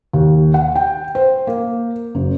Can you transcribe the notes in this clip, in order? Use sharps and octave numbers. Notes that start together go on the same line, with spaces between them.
D#2
F#5
G5
C5
A#3
F#1